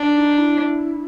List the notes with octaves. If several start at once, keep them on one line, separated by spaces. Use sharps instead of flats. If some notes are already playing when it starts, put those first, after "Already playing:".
Already playing: D4
D#4
E4